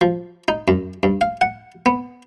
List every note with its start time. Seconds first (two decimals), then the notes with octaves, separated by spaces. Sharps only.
0.01 F3
0.48 D#4
0.68 F#2
1.03 G2
1.21 F5
1.41 F#5
1.86 B3